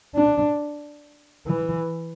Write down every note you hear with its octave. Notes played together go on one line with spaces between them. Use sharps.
D4
E3